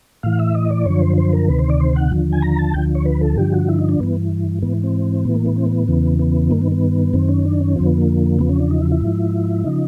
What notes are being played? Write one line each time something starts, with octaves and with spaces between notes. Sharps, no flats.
A2 E3 F5
E5
D#5
D5
F#2 D3 F3 C#5
C5
C5
A#4
D2 C3 D#3 B4
C5
D5
C5
F#5
D#2 D3 F3
G#5
A#5
A5
D2 D3 F3 G5
C#5
B4
A4
G2 D3 F3 G4
F#4
E4
D#4
D4
G2 E3 B3
G#2 E3 B3
C4
A2 E3 B3
A#3
B3
C4
B3
E2 C#3 E3
B3
G2 D#3 A#3
B3
B3
F#2 D#3 C4
C#4
D4
C#4
F2 D3 F3 C4
B3
A#3
E2 C#3 F3 B3
C#4
D4
D#4
E4
E4
G#2 F3
C#3 F3 D#4